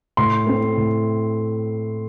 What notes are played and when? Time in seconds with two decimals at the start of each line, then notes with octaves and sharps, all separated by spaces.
0.17 A2 C6
0.47 A3 C4
0.77 A2